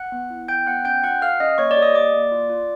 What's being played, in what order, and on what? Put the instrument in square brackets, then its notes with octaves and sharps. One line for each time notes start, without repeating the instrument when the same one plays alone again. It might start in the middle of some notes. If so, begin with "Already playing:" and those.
Already playing: [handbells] F#5 F#6
B3
E4
B3 G5 G6
B3 F#5 F#6
C#4 G5 G6
F4 F#5 F#6
A4 F5 F6
C#4 D#5 D#6
A#3 C#5 C#6
D5 D6
G4
D#5 D#6
A#3 D5 D6
A#3
F4
F4